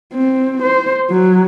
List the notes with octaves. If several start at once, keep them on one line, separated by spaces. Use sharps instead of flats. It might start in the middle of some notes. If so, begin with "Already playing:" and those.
C4
C5
F#3